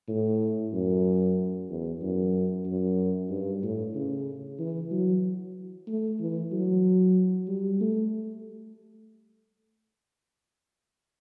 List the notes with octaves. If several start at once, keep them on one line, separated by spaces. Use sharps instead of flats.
A2
F#2
E2
F#2
F#2
G2
A2
C#3
E3
F#3
A3
E3
F#3
G3
A3